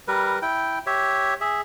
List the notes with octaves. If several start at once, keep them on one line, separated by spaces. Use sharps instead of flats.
G3 A#4 B4
E4 G5
G4 C#5 E5
G#4 E5